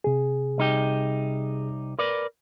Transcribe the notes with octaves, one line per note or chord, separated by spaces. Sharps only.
C3 G#4
C2 D#4 G4
A#4 B4 D5